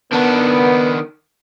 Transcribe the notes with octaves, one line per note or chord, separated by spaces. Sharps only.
D#3 B3 D4